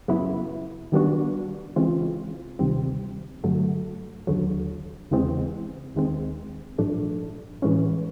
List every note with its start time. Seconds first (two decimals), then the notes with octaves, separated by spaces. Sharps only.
0.08 F#2 C#3 F#3 B3 E4
0.92 D#3 G3 B3 D4 F#4
1.76 C#3 E3 G#3 C4 F4
2.59 D2 C3 D#3 G3 C4
3.43 G2 D3 F#3 A3
4.27 D#2 D3 F#3
5.11 E2 C#3 E3 G#3 C4
5.95 D#2 D#3 G#3 C4
6.78 A#1 G#2 F3 A3 D4
7.62 A2 E3 G#3 C#4